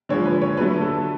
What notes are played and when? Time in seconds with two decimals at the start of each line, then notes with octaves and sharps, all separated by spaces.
0.09 D3 F3 G#3 C#5
0.25 B4
0.42 C#5
0.57 D3 F#3 A3 B4
0.81 A4